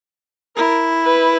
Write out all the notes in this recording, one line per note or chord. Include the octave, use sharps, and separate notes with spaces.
E4 A#4
B4